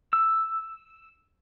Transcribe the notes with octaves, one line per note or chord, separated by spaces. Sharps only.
E6